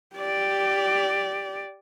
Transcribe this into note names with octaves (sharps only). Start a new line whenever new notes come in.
G4 D5